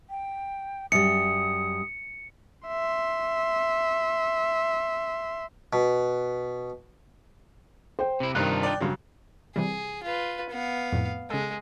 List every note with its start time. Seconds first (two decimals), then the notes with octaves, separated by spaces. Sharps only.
0.10 G5
0.92 F#2 G3 D#6 C#7
2.68 E5 C6
5.73 B2
7.99 C5 G5
8.20 C3 E4
8.35 G2 C3 D#3 D4 D#4 F4 F#6
8.63 D5 G5
8.81 G2 C#3 F#3
9.56 C3 E3 G3 G#4
10.03 F4 B4
10.50 B3 F5
10.93 F2 A2
11.30 C#3 G#3 A4